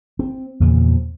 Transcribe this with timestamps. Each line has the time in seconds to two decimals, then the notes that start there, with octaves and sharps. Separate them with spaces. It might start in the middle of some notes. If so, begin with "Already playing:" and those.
0.19 C4
0.60 E2 A#2 C#3 F3